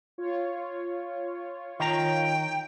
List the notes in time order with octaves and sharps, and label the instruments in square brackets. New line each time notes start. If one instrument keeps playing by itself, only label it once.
[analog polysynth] F4 C#5
[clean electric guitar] D#3 A#5 [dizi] G5